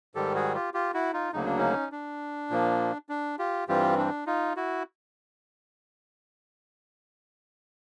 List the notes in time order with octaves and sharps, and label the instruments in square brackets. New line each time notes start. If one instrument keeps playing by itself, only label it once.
[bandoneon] G#2 D#3 G3 G4 A4
F#4 G#4
F4 G4
F4 G4
E4 F#4
D#4 F4
D2 C#3 F#3 A#3 D#4
D4
C#4 D#4
D4
A#2 F3 A#3
D4
F4 G4
G2 E3 G3 C4 F4 G4
D4
D#4 F4
E4 F#4